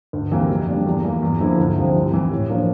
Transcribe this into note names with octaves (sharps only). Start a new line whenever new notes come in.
D2
C3 E3 A#3
F2
D3 G3 A#3 D4
E2
E3 A#3
E2
D3 F3 A#3 E4
D2
C3 F3 C4
C2
C3 E3
A2
F3 A#3 D4